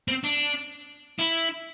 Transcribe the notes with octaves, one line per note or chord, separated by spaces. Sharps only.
C4
D4
E4